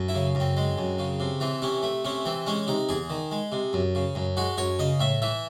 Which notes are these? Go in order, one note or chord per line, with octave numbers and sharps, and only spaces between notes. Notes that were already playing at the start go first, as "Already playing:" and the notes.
Already playing: F#2
E4
C#3
F#2
C4
G#3
F#2
C#3
C3
E3 C4
C3 C#4
A3
C3 C#4
E3 C4
G#3 C#4
C3 D#4
E2 G#4
D#3
G#3
C3
F#2
C#3
F#2
G#3 F#4
F#2 C#5
C#3 D#5
A2 E5
E3 E5